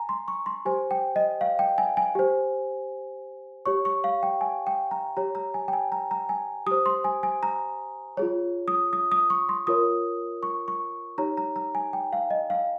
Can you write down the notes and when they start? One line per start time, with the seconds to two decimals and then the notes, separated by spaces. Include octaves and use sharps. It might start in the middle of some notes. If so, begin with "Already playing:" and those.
Already playing: G#5 A#5
0.09 C6
0.28 C#6
0.46 C6
0.65 G4 C5 G#5
0.91 G5
1.16 D#5
1.41 F5
1.59 G5
1.78 G#5
1.97 G#5
2.15 G4 C5
3.66 G4 C#5 C#6
3.85 C#6
4.04 F5
4.23 G5
4.41 G#5
4.67 G5
4.91 A#5
5.17 G4 C#5 A#5
5.35 A#5
5.54 G#5
5.68 G5
5.73 G#5
5.92 A#5
6.11 A#5
6.29 G#5
6.66 G4 C5 D#6
6.86 C6
7.04 G#5
7.23 G#5
7.43 A#5
8.17 F4 G#4 C#5
8.68 D#6
8.93 D#6
9.12 D#6
9.30 C#6
9.49 C6
9.67 F4 A#4 C#5 D#6
10.43 C#6
10.68 C#6
11.18 D#4 G4 C#5 A#5
11.37 A#5
11.56 A#5
11.75 G#5
11.93 G5
12.13 F5
12.31 D#5
12.50 F5